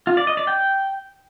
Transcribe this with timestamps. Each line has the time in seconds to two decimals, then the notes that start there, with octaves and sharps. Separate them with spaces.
0.07 F4
0.17 D5
0.27 D#5
0.37 D5
0.47 G5